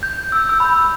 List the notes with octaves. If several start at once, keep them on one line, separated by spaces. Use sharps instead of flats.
G6
E6
G6
E6
B5